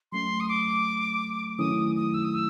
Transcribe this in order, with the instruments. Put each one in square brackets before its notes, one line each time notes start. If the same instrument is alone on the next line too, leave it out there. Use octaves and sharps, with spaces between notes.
[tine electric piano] F#3 A3 C#4 [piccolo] C6
[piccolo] D#6
D6
[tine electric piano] D#3 F#3 A3 C#4 E4 [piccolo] D#6
[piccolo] D#6
E6
D#6
E6